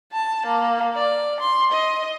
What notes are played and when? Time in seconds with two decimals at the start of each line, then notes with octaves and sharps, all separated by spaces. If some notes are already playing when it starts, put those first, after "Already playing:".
0.13 A5
0.46 A#3
0.94 D5
1.40 C6
1.72 D#5